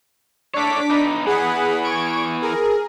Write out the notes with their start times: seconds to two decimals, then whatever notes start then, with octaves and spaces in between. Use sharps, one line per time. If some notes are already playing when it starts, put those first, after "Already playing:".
0.54 D4 A4 C#5 D6 B6
0.90 B3 D#4
1.26 E3 B3 G#4 F#5 B5
1.83 C#6 G#6 D7
2.42 G#4 A#4